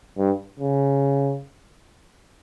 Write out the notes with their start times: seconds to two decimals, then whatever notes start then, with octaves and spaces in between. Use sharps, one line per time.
0.18 G2
0.60 C#3